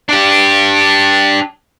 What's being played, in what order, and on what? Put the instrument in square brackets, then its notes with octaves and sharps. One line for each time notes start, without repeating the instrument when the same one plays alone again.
[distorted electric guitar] D4 G4